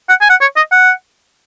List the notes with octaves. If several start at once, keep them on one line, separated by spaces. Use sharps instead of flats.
F#5
G#5
F#5
C#5
D#5
F#5